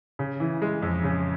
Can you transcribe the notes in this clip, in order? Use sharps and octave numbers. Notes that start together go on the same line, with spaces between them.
C#3
E3
G#3
F2
C#3